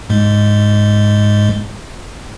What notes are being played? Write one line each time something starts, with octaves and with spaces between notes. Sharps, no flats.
G#2 G#3